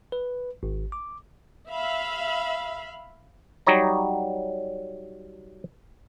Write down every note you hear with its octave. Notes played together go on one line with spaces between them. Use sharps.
B4
G#1
D6
E5 F5 B5
F#3 G3 D#4 C#5 A#5